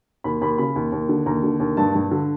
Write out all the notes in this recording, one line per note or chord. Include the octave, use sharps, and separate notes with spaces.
D#2 B5
D#2 B5
C#3 B5
D#2
D#2
D3
D#2 A#5
D3
D#2
G2 A5
G2
D3